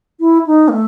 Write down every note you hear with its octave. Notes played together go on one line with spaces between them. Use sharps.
E4
D#4
A#3
A3